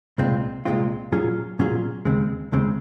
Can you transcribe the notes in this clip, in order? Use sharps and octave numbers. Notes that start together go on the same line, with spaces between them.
C2 A#2 G#3 C4 F4
C2 A#2 G#3 C4 F4
A#2 F#3 C#4 F4 G#4
A#2 F#3 C#4 F4 G#4
D#2 C#3 G#3 C4
D#2 C#3 G#3 C4